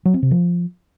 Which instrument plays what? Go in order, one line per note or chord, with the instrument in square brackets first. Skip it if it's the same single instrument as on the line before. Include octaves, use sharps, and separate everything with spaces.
[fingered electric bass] F#3
C4
C3
F3